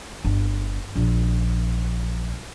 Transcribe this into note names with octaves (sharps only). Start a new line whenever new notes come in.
G1
A#1